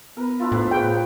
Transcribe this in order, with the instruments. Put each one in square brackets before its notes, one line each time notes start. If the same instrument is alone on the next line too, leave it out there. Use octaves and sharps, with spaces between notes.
[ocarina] B3 [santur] A#4 B4
[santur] D4 E4 F4
[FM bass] A2 [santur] D#4 B4 C5
[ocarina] G#4 [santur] A#4 B4 C#5 [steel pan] G5